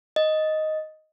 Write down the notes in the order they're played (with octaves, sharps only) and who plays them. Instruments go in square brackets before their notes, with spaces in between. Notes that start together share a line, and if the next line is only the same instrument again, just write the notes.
[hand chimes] D#5